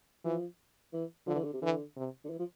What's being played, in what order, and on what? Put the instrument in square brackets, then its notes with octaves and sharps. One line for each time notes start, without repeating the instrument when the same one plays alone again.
[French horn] E3 [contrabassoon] F3
[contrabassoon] E3
[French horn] D3 [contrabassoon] F3
[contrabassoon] E3
D3
C3
[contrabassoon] D3 [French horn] E3
[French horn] C3
[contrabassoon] D3
E3
F3